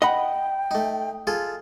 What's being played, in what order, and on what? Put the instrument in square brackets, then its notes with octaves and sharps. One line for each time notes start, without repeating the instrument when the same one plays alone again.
[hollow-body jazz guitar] D#5 F#5 B5 [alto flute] G5
[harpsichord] A3 D#4
F4 G#4 A4